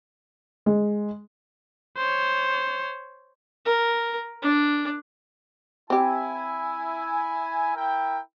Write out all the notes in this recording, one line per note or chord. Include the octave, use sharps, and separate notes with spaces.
G#3
C5 C#5
A#4
D4
C4 E4 G4 G#5
E4 A#4 G5